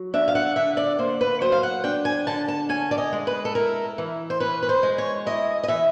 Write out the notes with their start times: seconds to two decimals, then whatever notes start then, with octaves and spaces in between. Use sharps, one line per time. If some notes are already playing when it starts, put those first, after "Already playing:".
Already playing: F#3
0.14 D4 E5
0.28 F5
0.35 F#5
0.56 D3 E5
0.77 D5
0.99 A#3 C5
1.21 B4
1.41 F#3 C5
1.52 F5
1.63 F#5
1.84 D4 G5
2.05 G#5
2.27 D3 A5
2.48 A5
2.69 C#4 G#5
2.91 D5
2.98 D#5
3.12 G#3
3.27 B4
3.45 A4
3.55 E4 A#4
3.98 E3
4.30 C5
4.40 C#4 B4
4.63 B4
4.69 C5
4.83 G#3
4.98 C#5
5.26 E4 D#5
5.63 D#5
5.68 E3 E5